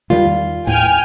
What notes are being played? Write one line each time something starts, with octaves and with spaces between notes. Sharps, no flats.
E2 D#3 G3 F4
D#2 A2 G5 G#5 F6